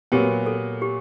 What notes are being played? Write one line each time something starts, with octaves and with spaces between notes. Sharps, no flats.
A#2 F#3 B3 G4
A4
G4